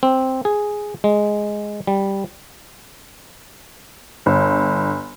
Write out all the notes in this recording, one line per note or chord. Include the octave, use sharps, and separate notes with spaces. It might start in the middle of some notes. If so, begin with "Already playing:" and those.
C4
G#4
G#3
G3
G1